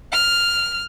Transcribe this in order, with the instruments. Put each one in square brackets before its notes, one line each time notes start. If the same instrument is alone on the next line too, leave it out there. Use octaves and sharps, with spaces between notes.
[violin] F6